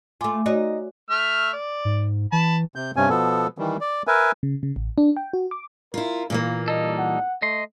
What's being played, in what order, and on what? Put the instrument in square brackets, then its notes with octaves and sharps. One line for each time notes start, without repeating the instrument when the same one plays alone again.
[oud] A3 F4 [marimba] G#5 D6
[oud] D#4 [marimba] F#4 C#5 D5
[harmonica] A3 E5 F6
D5
[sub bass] G#2
[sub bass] E3 [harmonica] A5 B5
[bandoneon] C3 G6
G2 C3 C#4 G#5
B2 F3 B3 A4
D#3 E3 G3
D5
A#4 B4 E5 G#5
[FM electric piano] C#3
C#3
A1
D4
G5
F#4
D6
[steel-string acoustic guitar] E4 F4 [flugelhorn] A#4
[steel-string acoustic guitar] A#2 E3 A#3 [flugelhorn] F4
[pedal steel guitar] G3 D#4 A4 [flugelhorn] D#5
[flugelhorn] F#5
[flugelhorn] A3 [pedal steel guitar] D#5 C6